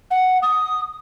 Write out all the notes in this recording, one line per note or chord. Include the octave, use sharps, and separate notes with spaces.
F#5
D#6